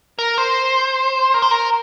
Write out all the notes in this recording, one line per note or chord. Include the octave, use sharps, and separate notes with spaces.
A#4
C5
A#4
C5
A#4